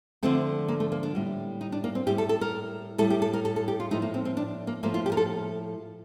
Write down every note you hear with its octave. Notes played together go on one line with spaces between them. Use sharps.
D3 F3 A3 C4
A#3
A3
A#3
D4
A2 G3
D#4
D4
A#3
C4
A2 G3 G4
A4
A4
A#4
A2 G3 A4
G4
A4
A#4
A4
A4
G4
F4
A2 F3 A3 D#4
A#3
C4
C4
D4
A#3
A2 F3 A3 A#3
F4
G4
A#4
A4